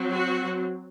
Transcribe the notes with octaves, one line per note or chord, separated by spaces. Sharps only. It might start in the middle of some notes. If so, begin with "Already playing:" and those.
Already playing: F#3 C4
F#4